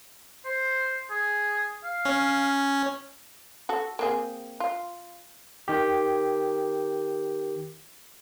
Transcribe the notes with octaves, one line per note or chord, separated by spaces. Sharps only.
C5
G#4
F5
C#4
F#4 A4
A#3 C4 G#4
F4
D#3 G4